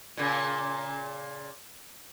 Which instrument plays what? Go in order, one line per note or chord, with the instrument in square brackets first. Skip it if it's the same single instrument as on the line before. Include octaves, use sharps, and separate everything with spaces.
[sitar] A#2 C#3